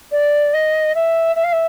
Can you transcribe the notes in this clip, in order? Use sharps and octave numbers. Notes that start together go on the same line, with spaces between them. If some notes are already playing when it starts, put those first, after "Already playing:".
D5
D#5
E5
E5
F5
E5